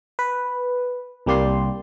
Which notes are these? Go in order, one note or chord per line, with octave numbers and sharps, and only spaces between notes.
B4
C2 G3 A#3 G4 D5 C6